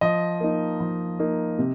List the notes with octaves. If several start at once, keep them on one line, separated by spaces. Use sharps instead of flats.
F3 D#5
A#3 D#4
F3
A#3 D#4
C3